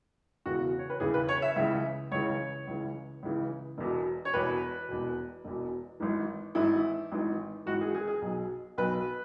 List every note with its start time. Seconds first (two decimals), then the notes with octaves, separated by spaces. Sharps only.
0.46 E1 E2 C#3 E3 F#4
0.79 C#5
0.90 B4
1.00 E1 E2 C#3 E3 G#4
1.14 B4
1.29 C#5
1.42 E5
1.56 C#2 C#3 E3 E5
2.11 C#2 C#3 E3 C#5
2.67 C#2 C#3 E3
3.23 C#2 C#3 E3
3.78 E1 E2 B2
4.25 C#5
4.33 E1 E2 B2 B4
4.88 E1 E2 B2
5.45 E1 E2 B2
6.00 G#1 G#2 E3
6.55 G#1 G#2 E3 E4
7.12 G#1 G#2 E3
7.66 G#1 G#2 E3 F#4
7.81 G#4
7.95 G#4
8.07 G#4
8.22 B1 B2
8.78 B1 B2 B4